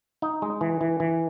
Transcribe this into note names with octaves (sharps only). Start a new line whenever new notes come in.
D#4
G#3
E3
E3
E3